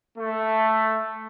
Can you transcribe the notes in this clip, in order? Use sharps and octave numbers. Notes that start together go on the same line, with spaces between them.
A3